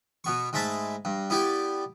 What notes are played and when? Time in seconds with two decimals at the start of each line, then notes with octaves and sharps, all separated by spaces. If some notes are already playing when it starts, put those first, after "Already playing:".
0.24 B2 B3 C#6
0.53 G#2 G#3 A3 E5 A5 B5
1.05 G2
1.30 B3 E4 G4 D5 G5